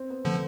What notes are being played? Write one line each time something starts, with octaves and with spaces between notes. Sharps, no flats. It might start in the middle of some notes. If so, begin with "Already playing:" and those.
Already playing: C4
B3
D3 F3 A3